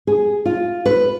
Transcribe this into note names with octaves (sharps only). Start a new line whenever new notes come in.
G#4
F4
B4